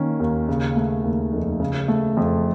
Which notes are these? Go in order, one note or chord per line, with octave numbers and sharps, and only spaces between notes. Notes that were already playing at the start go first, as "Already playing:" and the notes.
Already playing: D#3 A#3 C#4
D#2
C#3
A3
D#2
F1
C#3
A3
F2